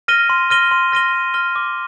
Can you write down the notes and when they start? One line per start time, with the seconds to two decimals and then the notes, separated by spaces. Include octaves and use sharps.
0.08 F6 A#6 D#7 G7
0.29 C6
0.50 F6 A#6 D#7 G7
0.71 C6
0.92 F6 A#6 D#7 G7
1.13 C6
1.34 F6 A#6 D#7 G7
1.56 D6